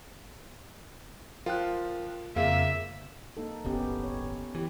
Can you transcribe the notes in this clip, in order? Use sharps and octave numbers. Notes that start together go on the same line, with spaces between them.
F3 F4 A#4 G5 F#6
F2 A#2 C#3 A#3 F4 G#4 E5 F5
A#3 D#4 A4
D1 G1 B3 C#4 G4
C#5
E3 G4